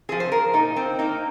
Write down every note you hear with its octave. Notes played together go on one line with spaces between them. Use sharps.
F3 C4 G#4
C5
A#4
A#2 D#4
C4
A#3 D#4